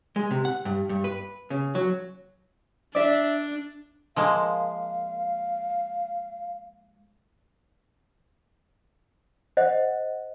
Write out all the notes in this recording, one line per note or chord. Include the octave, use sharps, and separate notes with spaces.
G#3
C3
F#5
G2
G2
B4
C#3
F#3
D4 D5 E5
F3 G#3 A#3 F5
C5 D#5 F#5